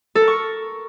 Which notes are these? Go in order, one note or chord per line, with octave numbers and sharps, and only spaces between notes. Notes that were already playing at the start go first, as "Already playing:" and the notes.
A4
A#4
C#6